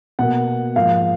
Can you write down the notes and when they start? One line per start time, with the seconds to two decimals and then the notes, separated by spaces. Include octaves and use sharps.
0.19 B2 A#3 F#5
0.76 G#2 F3 A#3 F5